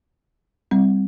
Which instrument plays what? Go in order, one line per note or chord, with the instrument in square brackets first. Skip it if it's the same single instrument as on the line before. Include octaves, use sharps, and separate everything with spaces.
[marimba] G3 C4